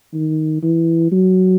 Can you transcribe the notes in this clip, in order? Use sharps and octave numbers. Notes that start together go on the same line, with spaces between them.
D#3
E3
F#3